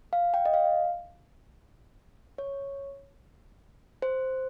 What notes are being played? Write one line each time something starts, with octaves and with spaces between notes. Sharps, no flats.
F5
G5
D#5
F5
C#5
C5